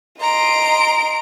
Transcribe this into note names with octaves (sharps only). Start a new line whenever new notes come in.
D#5 A#5 C6 D7